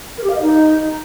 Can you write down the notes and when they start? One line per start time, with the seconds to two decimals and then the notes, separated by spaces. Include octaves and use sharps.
0.18 A#4
0.24 G4
0.30 F5
0.36 D#5
0.41 D#4